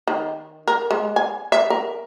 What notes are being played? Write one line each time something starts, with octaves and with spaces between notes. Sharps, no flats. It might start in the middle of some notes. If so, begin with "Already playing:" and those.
D#3
A#4
G#3
G#5
E5
A#4